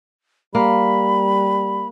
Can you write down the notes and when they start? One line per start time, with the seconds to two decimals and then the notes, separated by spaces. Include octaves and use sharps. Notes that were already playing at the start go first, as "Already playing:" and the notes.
0.55 G3 A#3 B5